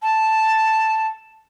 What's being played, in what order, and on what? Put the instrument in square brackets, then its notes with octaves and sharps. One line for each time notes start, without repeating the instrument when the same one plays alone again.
[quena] A5